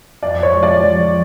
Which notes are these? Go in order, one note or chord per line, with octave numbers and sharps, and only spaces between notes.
F2 D5
C#5
G#3
D5
F3